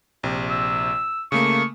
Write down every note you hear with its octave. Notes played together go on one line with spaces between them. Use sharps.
A#1 C3
E6
C#3 A3 A#3 C#6